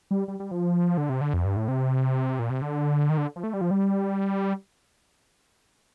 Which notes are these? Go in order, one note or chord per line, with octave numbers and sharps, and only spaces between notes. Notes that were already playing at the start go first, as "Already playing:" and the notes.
G3
G3
G3
F3
D3
C3
D3
F2
G2
A2
C3
A#2
C3
D3
D#3
D3
F3
A3
G3
F3
G3